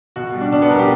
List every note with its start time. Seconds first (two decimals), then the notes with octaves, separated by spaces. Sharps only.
0.16 B2 F#4
0.34 G3
0.41 D4
0.52 B2 D4
0.62 B3
0.70 G3 A#4
0.79 G4